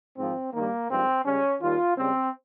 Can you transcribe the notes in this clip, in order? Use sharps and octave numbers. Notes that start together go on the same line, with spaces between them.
G#1 G#2 F3 C4
G2 D#3 G3 A#3
G#1 G2 F3 G#3 C4
C#2 C#3 G3 C#4
D#2 D#3 G3 F4
C#2 C#3 G3 C4